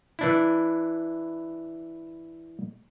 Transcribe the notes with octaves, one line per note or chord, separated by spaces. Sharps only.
E3 D4 E4